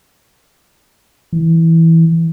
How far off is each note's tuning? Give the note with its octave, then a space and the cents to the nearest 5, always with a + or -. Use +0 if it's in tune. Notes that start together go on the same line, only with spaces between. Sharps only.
E3 -10